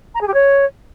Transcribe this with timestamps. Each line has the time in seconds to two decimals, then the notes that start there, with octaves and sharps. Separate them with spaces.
0.15 A#5
0.21 G#4
0.27 G4
0.34 C#5